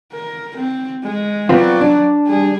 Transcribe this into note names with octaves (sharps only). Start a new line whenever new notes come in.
A#4
C4
G#3
F#3 B3 C4 F4 D5
D4
G3 G#4